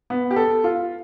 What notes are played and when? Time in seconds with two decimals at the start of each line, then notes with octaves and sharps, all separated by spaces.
0.10 B3
0.31 G4
0.36 A4
0.64 F4